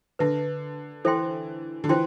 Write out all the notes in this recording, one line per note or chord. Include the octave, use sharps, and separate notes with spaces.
D3 B4 E5 A5
E3 A4 C5 E5 G5 C6
D3
E3 F4 C5 G5 C6